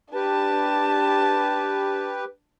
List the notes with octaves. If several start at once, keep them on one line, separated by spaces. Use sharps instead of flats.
D4 G4 B4 A5